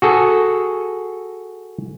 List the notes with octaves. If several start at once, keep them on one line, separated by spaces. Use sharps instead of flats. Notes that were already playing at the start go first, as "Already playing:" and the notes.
F#4 G#4 A4